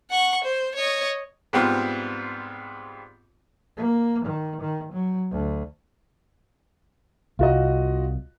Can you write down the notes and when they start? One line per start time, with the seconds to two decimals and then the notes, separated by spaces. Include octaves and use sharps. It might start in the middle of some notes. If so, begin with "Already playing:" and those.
0.11 F#5 C#6
0.44 C5
0.75 C#5 D#5
1.53 G#2 G3 B3 C4 F4
3.77 A#3
4.25 D#3
4.61 D#3
4.93 F#3
5.32 D2
7.39 C2 F4 F#4 D#5